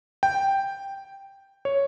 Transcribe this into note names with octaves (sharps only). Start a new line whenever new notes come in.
G5
C#5